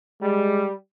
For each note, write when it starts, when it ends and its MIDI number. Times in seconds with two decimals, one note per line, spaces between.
0.21 0.72 55
0.21 0.66 56